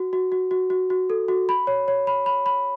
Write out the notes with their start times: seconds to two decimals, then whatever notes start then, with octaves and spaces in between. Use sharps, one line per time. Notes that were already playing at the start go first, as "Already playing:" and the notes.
Already playing: F#4
0.13 F#4
0.32 F#4
0.51 F#4
0.70 F#4
0.90 F#4
1.10 A4
1.28 F#4
1.49 B5
1.67 C#5
1.88 C#5
2.07 B5
2.26 B5
2.46 B5